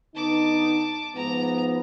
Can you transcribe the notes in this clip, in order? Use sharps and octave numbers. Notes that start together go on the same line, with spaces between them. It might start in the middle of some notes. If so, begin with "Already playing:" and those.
D3 B3 D#4 A5 D6
G#2 F3 B3 A#5